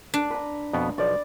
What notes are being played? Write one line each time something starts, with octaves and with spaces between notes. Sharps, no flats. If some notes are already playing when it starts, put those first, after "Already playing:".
D4
B4 A#5
F2 B2 B3
B1 F3 D5